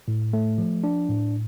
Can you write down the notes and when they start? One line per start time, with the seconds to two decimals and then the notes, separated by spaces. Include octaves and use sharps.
0.08 A2
0.33 A3
0.58 F3
0.84 D4
1.09 A2